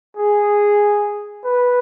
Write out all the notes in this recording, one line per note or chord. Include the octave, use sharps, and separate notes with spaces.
G#4
B4